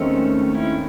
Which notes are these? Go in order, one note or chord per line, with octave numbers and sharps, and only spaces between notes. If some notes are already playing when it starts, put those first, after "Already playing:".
Already playing: D#2 D#3 G#3 A3 C4 C#4 D#4
C#4 E4